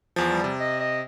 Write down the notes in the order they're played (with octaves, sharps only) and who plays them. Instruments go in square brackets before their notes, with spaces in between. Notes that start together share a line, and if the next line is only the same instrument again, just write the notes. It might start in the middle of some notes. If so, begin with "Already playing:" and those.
[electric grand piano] E2 F3
[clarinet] G3
[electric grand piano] C3
[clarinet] D#5
D#5